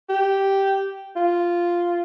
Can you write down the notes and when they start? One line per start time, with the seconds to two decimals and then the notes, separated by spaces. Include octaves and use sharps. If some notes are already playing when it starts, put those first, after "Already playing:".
0.09 G4
1.16 F4